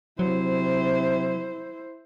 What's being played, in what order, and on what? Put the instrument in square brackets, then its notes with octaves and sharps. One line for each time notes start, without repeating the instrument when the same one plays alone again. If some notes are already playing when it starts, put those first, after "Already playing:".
[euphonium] C3 [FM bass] F#3 [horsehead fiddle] E4 C5